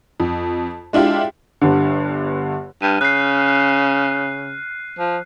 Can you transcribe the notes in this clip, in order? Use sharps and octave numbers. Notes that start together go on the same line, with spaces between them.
F2
G#3 D4 E4 F4 G4
G1 G2 D3
G2 F6 D#7
C#3 F#6 C7
F3